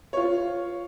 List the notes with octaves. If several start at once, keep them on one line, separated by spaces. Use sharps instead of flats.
F4 C#5